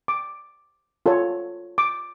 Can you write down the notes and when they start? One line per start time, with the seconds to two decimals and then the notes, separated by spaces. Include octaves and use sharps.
0.08 D6
1.06 F4 A4 C#5
1.78 D6